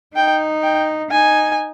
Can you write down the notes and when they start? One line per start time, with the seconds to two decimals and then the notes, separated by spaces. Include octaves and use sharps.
0.16 D#4 G5
0.63 G5
1.11 D#4 G#5